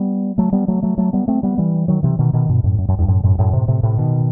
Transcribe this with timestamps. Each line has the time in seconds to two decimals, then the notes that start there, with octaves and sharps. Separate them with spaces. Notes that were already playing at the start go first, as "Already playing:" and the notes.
Already playing: G3 B3
0.38 F#3 A3
0.53 G3 B3
0.68 F#3 A3
0.82 F#3 A3
0.98 F#3 A3
1.13 G3 B3
1.28 A3 C4
1.43 G3 B3
1.58 E3 G3
1.88 D#3 F#3
2.03 C3 E3
2.19 B2 D#3
2.33 B2 D#3
2.49 G2 B2
2.64 F#2 A2
2.78 F#2
2.88 F#2
2.98 E2 G2
3.08 F#2 A2
3.23 F#2 A2
3.39 F#2 A2
3.53 A2 C3
3.68 A2 C3
3.83 A2 C3
3.98 B2 D#3